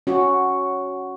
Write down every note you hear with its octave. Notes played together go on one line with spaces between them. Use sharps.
C#4 F#4